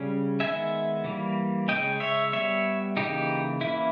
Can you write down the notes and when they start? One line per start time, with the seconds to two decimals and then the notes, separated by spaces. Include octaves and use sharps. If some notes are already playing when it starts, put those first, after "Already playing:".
Already playing: C#3 G3 C#4
0.40 D#3 G#3 B3 E5 G#5
1.04 E3 G3 A#3
1.68 C#3 G#3 C#4 D#5 G5
2.00 C#5 E5
2.33 G3 B3 C#5 E5
2.96 C#3 E3 A#3 D#4 G4
3.61 E3 A#3 C#4 E4